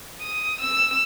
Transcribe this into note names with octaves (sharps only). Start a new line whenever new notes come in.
D#6
E6